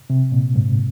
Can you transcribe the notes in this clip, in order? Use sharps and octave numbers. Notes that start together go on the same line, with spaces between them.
C3
A#2
G#2